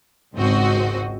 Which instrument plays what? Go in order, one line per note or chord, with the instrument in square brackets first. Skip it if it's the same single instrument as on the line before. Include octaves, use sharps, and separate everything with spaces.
[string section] G#1 C#2 G#2 C4 F#4 D#5